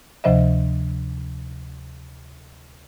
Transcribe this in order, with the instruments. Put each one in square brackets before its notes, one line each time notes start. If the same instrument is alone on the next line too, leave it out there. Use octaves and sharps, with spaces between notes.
[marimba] D2 C3 F3 C5 D#5 E5